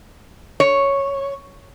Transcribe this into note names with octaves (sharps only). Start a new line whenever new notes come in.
C#5